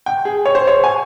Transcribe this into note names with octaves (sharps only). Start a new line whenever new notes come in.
G5
G#4
C#5
C5
C#5
G#5